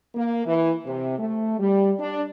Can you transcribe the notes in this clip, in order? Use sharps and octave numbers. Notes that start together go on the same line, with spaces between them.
A#3
E3
C3
A3
G3
D4